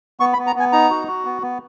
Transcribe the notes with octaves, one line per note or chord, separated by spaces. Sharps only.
B3 C#6
B5
B3
A#5
B3 G#5
D#4 A#5
F#4
F#4
B3
B3